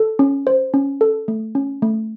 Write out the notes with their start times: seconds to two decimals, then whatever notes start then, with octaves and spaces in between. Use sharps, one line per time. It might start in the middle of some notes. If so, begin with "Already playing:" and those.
Already playing: A4
0.19 C#4
0.47 C5
0.74 C#4
1.01 A4
1.28 A3
1.55 C#4
1.82 A3